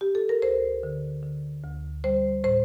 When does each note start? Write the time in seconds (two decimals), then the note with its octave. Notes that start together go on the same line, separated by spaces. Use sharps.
0.01 G4
0.15 A4
0.29 A#4
0.42 D2 C5
0.83 D3
1.23 D3
1.64 D2
2.04 G3 C5
2.44 A2 C5